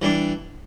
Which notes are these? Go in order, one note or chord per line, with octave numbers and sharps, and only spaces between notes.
E3 G3 D4